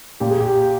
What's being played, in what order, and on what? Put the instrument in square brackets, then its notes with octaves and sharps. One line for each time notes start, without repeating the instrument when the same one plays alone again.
[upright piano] A#2 [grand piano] G4
[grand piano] G#4
G4